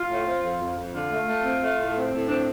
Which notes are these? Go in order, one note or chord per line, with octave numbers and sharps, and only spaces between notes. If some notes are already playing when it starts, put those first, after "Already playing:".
Already playing: F4
A2
C4
F2
F2
F2
D3 F4
A3
A3
C4
A3
A2
C4
A2
C4 D4